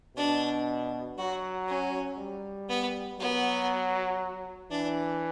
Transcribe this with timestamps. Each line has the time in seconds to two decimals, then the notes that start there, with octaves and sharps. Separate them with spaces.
0.17 B2 D4
1.18 F#3 F#4
1.68 C#4
2.18 G3
2.69 B3
3.19 F#3 B3
4.71 E3 D4